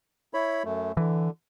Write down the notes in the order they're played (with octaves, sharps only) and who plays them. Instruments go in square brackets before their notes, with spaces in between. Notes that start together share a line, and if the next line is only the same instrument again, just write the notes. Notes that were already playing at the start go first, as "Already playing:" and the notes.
[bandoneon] E4 C#5 B5
F#2 A3
[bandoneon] D3 [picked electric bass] E3